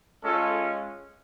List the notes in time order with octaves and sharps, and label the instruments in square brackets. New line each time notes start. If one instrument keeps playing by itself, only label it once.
[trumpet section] G#3 C#4 F4 A4